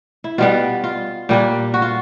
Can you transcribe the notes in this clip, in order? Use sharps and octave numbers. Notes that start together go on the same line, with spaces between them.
E4
B2 G3 B3 F4
F4
A#2 G3 A#3 D4
F#4
F4